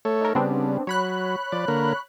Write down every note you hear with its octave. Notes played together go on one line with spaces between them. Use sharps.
A3 A4 C#5
D#4 A#4
C#3 G3 B3 C4 D4
F#3 C#5 B5 F#6
F3 D5
D3 A#3 A#4